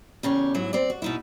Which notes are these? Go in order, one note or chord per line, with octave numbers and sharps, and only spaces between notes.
E2 C#3 G4 C#5
G#2 F#3 E4
C4 D5
F#4
B2 D#4 E4